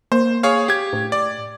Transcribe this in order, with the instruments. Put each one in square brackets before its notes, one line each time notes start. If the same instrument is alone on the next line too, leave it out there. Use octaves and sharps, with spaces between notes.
[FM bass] A#3 [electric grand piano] C5
[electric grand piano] G#4 C#5 F5
G4 G#6
[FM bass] A2
[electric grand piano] D5